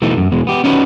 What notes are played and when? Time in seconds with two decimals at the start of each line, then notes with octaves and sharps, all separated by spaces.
0.02 B2 E3 A3 D#4
0.17 F#2
0.32 E2 B2 G#3
0.47 B3 G4
0.64 C#4 D#4 E4 F#4 B4